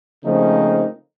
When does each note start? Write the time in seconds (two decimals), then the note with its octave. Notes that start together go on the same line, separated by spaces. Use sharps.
0.24 C#3 F3 A3 A#3 C4 D#4